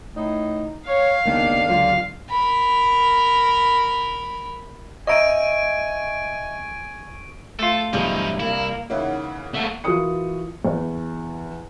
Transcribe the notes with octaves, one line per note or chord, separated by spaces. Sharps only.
A2 D#4
C#5 F5
C#2 D#3 A#3 B3 D4
C#2 D3 F#3 D4 F4
A#4 B5
D#5 E5 G#5 A#5 C#6 D7 D#7
A3 F4 A4
B1 E2 G2 F3 D#4 E4
C2 A#3 E4
C#3 E3 A#3 D#4 C#5 E5 F#5
A3 A#3 F#5
E3 F4 F#4 A#4 D#6 C#7
E2